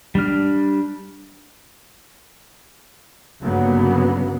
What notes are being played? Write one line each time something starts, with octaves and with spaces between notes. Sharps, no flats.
G3 D4 F6
G1 C#3 F#3 A#3 B3